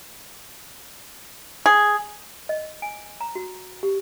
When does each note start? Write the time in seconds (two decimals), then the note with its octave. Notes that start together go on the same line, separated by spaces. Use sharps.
1.66 G#4
2.49 D#5
2.82 G#5
3.21 A#5
3.35 F#4
3.83 G4